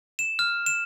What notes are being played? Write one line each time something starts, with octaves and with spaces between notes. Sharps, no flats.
E7
F6
E7